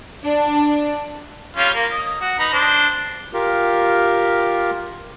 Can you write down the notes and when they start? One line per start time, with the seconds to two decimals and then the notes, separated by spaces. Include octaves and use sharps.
0.23 D4
1.56 G3 C#4 F4
1.75 A#3
1.92 D#5
2.21 F#4
2.39 D#4 B4 A#5
2.53 D4 C5
3.33 F4 G4 A#4